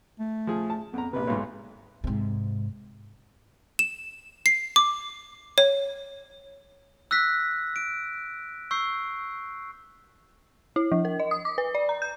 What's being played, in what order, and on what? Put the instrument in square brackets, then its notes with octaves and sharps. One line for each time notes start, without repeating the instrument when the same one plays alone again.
[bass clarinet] A3
[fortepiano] F3 G#4
A5
[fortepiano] F2 A#5 [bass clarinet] B3
[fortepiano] A#1 C3 [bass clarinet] B4
[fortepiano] B1 G#2
[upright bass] G#2 C3
[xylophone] E7
C7
D6
C#5
[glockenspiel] E6 F#6 A#6 B6
D7
C#6 E6 G6 C7
[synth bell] E4
F3
A#4
D#5
D#6
D6
B4
D5
A#5
G6